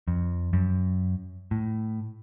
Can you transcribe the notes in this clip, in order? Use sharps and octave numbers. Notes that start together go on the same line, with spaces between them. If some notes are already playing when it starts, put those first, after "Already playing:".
F2
F#2
A2